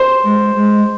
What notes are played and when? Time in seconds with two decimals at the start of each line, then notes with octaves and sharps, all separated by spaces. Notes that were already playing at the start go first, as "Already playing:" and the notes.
Already playing: C5
0.24 G#3
0.55 G#3